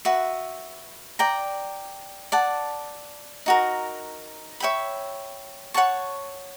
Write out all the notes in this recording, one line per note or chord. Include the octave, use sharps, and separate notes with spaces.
F#4 B4 E5
D5 G5 A#5
D5 F#5 A5
D#4 F#4 A#4
C#5 E5 G5 B5
C#5 F#5 A5 C#6